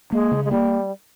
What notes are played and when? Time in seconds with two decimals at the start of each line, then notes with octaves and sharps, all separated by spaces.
0.12 G#3 A#3
0.32 C#3
0.45 G#3
0.51 G3 A#3